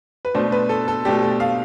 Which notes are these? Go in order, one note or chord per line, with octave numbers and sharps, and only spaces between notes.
B4
B2 A3 D4 C5
B4
A4
A4
B2 A3 D4 G4
A4
F5